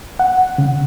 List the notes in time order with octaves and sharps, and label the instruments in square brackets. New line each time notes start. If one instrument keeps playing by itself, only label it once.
[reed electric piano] F#5
C#3